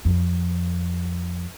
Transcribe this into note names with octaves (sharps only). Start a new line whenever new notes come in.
F2